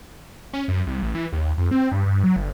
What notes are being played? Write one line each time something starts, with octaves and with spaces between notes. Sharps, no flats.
C#4
F#2
C2
A1
E3
D#2
F2
C4
G2
G2
F#3
G1